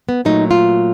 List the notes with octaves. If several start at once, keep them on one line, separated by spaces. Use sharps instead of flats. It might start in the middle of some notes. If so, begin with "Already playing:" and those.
B3
A#2 F#3 A3 D#4
F4